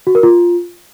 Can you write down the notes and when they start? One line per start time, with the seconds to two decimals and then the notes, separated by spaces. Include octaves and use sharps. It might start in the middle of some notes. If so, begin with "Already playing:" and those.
0.07 F#4
0.15 A#4
0.23 F4